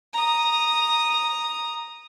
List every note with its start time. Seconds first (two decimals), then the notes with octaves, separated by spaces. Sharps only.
0.14 A#5 D#6